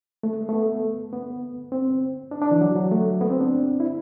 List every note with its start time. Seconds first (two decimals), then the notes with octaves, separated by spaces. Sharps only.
0.23 A3
0.49 A3
0.53 B3
1.13 B3
1.72 C4
2.31 D4
2.42 D4
2.51 E3
2.61 F#3
2.75 F#3
2.91 A3
3.21 B3
3.30 C4
3.40 D4
3.80 E4